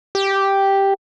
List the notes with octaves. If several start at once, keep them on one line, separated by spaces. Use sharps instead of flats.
G4